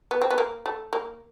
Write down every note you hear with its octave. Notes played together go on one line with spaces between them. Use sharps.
B3
C4
B3
A#3
A3
A#3